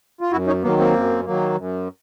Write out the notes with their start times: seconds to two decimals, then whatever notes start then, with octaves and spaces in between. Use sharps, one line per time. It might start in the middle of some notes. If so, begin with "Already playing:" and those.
0.21 F4
0.32 F#2 E4 F#4
0.47 C#4 D#4
0.63 D#3 F#3 A#3 B3
0.78 A#3 C4
0.94 F#2
1.25 D#3 F#3 A#3
1.57 F#2